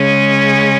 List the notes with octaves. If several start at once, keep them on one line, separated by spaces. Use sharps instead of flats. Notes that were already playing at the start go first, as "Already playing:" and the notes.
Already playing: C#3 G#3 C#4